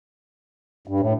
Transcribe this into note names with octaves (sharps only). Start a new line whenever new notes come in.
G2
A2